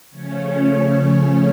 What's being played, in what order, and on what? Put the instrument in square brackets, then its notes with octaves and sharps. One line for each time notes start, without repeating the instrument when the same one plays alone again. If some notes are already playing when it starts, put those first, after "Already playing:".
[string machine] C#3 F3 A3 C#4 C#5